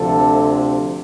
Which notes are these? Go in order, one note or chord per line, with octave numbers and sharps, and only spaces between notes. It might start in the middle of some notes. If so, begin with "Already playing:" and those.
Already playing: D2 C3 F3 A4